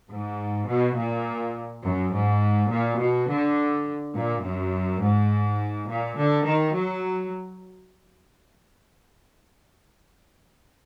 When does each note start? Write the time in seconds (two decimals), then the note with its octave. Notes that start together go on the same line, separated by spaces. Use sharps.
0.10 G#2
0.68 B2
0.97 A#2
1.83 F#2
2.12 G#2
2.70 A#2
2.99 B2
3.28 D3
4.15 A#2
4.43 F#2
5.01 G#2
5.87 A#2
6.17 D3
6.45 D#3
6.74 F#3